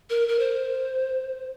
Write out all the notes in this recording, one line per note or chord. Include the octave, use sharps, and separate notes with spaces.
A#4
A#4
C5